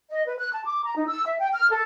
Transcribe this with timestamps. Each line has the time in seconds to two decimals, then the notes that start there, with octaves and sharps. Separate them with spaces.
0.10 D#5
0.26 B4
0.38 F#6
0.52 A5
0.65 D6
0.84 A#5
0.96 D#4
1.08 E6
1.25 E5
1.39 G5
1.54 F6
1.71 A4